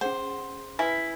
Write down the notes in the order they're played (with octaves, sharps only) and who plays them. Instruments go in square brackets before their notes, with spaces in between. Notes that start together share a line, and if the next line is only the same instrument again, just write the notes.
[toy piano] C#4 G#4 F#5 [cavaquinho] C5
[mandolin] E4 [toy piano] B4 E5 G#5